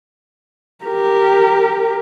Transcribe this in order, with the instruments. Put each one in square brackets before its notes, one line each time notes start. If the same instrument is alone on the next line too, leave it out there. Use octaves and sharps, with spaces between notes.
[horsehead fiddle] G4 A#4